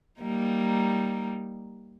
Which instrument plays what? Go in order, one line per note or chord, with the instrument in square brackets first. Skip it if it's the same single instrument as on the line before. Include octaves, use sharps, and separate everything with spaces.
[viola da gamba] G3 A#3 D#4